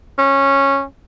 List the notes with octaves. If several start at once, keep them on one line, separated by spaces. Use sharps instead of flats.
C#4